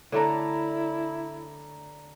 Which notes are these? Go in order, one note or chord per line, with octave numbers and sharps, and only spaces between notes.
D3 A3 D4 E4 D5 A5 A#5